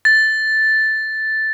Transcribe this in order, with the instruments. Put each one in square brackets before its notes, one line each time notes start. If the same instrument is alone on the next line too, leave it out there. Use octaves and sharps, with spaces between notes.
[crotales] A6